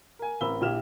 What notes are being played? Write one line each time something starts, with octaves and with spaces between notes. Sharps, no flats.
A#4 G#5
A1 C4 A#4 B5 E6 G7
A#1 E4 G4 F6 E7